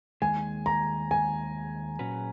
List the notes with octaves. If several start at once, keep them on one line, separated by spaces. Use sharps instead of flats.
D#2 D#3 G#3 G#5
A#5
G#5
A#2 F#3 C#4 F#4 B4